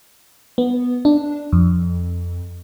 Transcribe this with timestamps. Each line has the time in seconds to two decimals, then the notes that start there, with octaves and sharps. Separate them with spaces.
0.58 B3
1.05 D4
1.53 F2